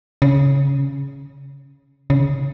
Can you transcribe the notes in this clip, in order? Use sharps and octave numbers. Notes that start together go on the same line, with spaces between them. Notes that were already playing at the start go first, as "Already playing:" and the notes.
C#3
C#3